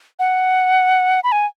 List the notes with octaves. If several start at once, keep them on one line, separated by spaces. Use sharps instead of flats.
F#5
B5
G#5